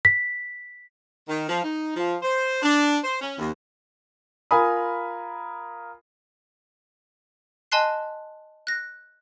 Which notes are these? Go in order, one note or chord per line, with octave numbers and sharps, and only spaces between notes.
B6
D#3
F3
D#4
F3
C5
D4
C5
C#4
D#2
F4 A#4 G#5 A#5 B5 D#6
D#5 G#5 A5 C6 F#6 C7
F#6 A#6